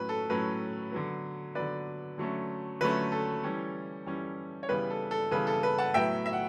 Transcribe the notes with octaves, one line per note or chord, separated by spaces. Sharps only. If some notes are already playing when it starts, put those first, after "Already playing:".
Already playing: A2 F#3 C#4 B4
A4
A2 F#3 C#4 B4
D3 F#3 B3
D3 F#3 B3 B4 D5
D3 F#3 A3 C#4
D3 F#3 A3 C#4 B4
A4
E3 G3 C#4
E3 G3 C#4
C#5
C#3 E3 G3 B3 B4
A4
A4
C#3 E3 G3 B3 B4
A4
B4
F#5 A5
A2 F#3 B3 E5 G5
E5
F#5